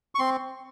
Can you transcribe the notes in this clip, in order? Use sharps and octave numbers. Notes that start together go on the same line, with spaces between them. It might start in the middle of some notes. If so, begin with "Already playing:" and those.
C#6
C4 C6